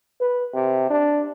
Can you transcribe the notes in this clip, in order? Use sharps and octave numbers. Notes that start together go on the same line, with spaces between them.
B4
C3
D4